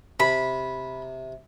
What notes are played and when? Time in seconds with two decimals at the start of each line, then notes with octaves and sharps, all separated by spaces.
0.20 C3 B5